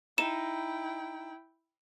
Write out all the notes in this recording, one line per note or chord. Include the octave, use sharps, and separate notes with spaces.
D#4 E4 G5 E7